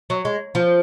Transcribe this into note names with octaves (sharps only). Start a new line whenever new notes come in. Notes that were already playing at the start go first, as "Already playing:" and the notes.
F#3
G#3
F3